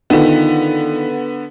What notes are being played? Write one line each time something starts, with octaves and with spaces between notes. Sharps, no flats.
D3 D#3 B3 F4